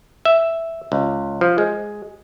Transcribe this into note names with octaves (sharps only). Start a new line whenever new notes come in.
E5
C#2
F3
G#3